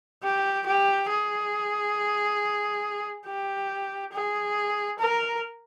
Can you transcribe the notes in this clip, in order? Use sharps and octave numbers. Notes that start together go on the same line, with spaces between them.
G4
G4
G#4
G4
G#4
A#4